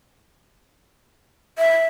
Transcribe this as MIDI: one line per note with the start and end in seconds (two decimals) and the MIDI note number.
1.58 1.86 76